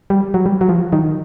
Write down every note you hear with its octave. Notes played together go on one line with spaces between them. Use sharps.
G3
F#3
G3
F#3
F3
D#3